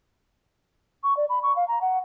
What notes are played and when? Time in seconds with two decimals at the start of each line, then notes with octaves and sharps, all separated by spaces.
1.03 C#6
1.17 D5
1.29 B5
1.43 C#6
1.56 F5
1.68 A#5
1.81 F#5